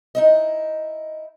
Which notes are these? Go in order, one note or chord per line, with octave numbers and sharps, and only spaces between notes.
D#4 E4 D#5